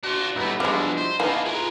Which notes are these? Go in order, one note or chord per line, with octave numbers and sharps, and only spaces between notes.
D4 F4 F#4
B1 G3 A3 B3 D#4 E4 B5
B2 E3 F3 G3 G#3 D4 E4
C5
E3 A#3 B3 D#4 G#4 F5 A5
F4 G#4 A#4 B4